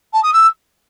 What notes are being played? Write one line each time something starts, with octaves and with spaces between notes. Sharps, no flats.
A5
D#6
E6